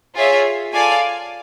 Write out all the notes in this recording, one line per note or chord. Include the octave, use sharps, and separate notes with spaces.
F4 G#4 C#5 E5
F4 A4 D5 F5 G#5